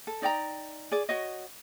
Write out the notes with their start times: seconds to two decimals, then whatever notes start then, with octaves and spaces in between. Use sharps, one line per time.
0.07 A4
0.22 D#4 D5 G5 A#5
0.91 G#4 D5
1.09 F#4 C#5 D#5